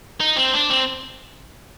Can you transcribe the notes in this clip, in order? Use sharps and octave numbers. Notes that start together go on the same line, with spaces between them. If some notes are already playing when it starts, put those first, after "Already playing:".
D#4
C4
D4
C4